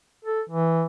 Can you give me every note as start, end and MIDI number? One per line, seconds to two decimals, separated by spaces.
0.25 0.42 69
0.50 0.86 52